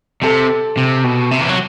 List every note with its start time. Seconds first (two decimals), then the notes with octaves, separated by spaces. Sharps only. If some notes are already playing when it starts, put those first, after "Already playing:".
0.23 C3 A4
0.77 C3
1.04 B2
1.31 C3
1.41 E3
1.49 F#3